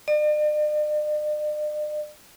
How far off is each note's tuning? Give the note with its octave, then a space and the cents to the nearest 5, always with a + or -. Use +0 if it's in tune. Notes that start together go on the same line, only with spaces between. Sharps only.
D5 +45